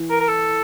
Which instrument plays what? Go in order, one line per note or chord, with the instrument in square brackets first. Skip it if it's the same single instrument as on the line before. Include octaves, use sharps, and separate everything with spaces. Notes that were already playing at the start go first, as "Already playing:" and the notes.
Already playing: [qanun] E3
[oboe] A#4
A#4
A4